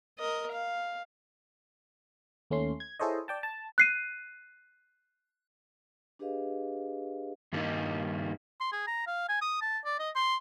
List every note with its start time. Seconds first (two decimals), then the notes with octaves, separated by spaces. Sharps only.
0.19 A#4 D#5
0.52 F5
2.51 D#2 A3 C#4 C6
2.80 G#6
3.00 E4 G#4 A4 C5 C#5 D#5
3.28 D5 G5 A5
3.43 A5
3.78 F#6 C7 D#7
6.19 D4 G4 G#4 B4 D#5 F5
7.53 G2 D#3 G3 A#3 D#4
8.60 C6
8.72 G#4
8.87 A#5
9.07 F5
9.29 G#5
9.41 D#6
9.61 A5
9.85 D5
9.99 D#5
10.15 C6